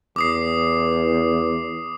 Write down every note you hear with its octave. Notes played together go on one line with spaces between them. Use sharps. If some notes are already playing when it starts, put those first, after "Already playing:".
E2 D6 D#6 C7